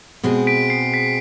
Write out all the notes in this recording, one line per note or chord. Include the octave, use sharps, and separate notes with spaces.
B2 G#3 C4 G#4
B6 D7
C7
B6